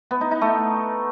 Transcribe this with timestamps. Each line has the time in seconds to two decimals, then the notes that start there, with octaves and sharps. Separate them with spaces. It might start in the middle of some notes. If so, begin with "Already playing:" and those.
0.11 B3
0.21 D#4
0.31 D#4
0.41 A3